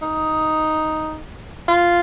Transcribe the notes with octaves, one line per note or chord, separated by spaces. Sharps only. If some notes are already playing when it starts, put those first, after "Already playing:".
D#4
F4